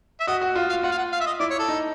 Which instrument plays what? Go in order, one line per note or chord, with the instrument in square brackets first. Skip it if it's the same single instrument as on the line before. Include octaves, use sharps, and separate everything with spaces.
[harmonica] E5
[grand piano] F#4 [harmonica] D#5
[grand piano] F#4
F4
[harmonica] F5
[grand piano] F4 [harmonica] F#5
[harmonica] F5
F#5
F5
E5
D#5
[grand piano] E4 [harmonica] D5
[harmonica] C#5
A4
[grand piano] D#4